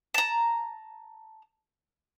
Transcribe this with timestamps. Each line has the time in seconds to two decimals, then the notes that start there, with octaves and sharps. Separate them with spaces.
0.14 A5 A#5